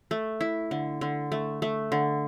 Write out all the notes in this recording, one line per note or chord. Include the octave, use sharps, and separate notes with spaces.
A3
E4
D3
D3
A3
A3
D3